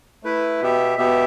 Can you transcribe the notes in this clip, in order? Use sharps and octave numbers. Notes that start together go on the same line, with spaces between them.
A3 E4 B4
B2 B3 G4 E5
B2 B3 G4 E5